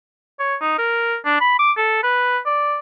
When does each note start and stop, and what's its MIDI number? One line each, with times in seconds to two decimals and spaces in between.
0.40 0.55 73
0.61 0.76 63
0.78 1.17 70
1.25 1.39 62
1.41 1.56 83
1.59 1.72 86
1.78 2.00 69
2.03 2.38 71
2.46 2.79 74